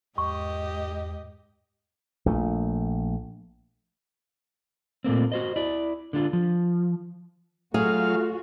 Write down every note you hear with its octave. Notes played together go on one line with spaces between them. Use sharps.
E2 G#2 G4 D#5 C#6
A#1 A3
A#2 A3 A#3 C4
F#4 C5 D#5
E4 D5
D3 D4 F4
F3
F#3 A3 F4 F#4 G#4 F5